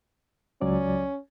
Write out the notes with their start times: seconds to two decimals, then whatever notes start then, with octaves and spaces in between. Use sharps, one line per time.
0.61 C#2 F#3 C#4 D5